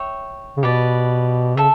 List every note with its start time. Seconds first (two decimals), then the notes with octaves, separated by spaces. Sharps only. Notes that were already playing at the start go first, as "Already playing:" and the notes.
Already playing: C#5 E5 G5
0.57 C#3
0.63 B2 G4 B4 D5
1.56 C#3 A4 E5